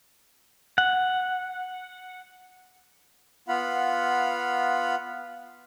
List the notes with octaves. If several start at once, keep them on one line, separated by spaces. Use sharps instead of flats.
F#5
B3 F4 F5 F#5 B5